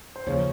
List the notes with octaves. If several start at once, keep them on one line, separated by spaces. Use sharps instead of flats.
C5
D#2 C#3 F3 C#5